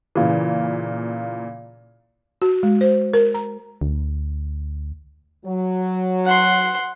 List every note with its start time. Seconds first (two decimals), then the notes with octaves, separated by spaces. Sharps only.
0.15 A#2 C#3 E3
2.42 F#4
2.63 G#3
2.81 C5
3.14 A#4
3.34 A#5
3.81 D2
5.45 F#3
6.25 F#5 C6